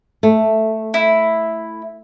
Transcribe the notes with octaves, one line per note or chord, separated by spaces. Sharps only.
A3
E4